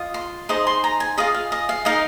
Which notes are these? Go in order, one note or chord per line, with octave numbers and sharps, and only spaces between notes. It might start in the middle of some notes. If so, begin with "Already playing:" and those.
Already playing: F4 D#5
C6
D#4 G#4 C5 D#5
C6
A#5
G#5
F4 G#4 D#5 F5
F5
D#5
F5
D#4 A#4 D#5 F5